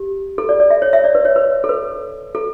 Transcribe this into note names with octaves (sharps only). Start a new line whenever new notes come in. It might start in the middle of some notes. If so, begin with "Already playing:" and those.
Already playing: G4
A4
D5
D5
E5
C#5
E5
D5
B4
C#5
B4
A4
B4
A4